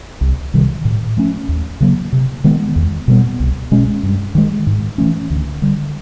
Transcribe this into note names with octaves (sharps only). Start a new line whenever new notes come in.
C2
C3 D#3 G3
A2
F3 A3 C#4
D#2
C#3 F#3 A#3
C3
D#3 G#3 B3
E2
B2 G3 B3
C2
B2 G#3 C#4
G2
D#3 G#3
G#2
E3 A3 C#4
D2
D3 G3